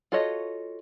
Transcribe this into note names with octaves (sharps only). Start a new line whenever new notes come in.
F4 F#4 A4 C#5 D#5